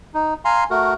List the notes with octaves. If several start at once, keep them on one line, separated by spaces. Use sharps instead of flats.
D#4
F5 G#5 A#5 C6
A3 F#4 A#4